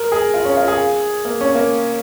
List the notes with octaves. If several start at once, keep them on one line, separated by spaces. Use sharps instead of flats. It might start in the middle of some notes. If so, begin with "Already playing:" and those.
Already playing: A#4
G#4
F4
C#4
F4
G#4
A#3
C#4
A#3